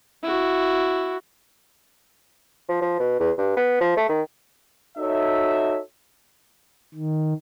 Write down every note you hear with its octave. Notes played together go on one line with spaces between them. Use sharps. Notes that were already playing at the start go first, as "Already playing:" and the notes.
E4 F#4
F3
F3
B2
E2
G2
B3
F3
A3
D#3
D#4 F#4 A4 C#5 E5
D#3